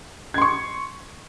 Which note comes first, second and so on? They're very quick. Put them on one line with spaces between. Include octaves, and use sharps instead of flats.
G#6 C6 C#6